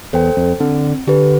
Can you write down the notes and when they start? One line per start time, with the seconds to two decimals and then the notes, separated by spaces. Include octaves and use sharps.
0.13 E2 A4 C5 G5
0.37 F2
0.60 D3 C4
1.07 D3 G4 B4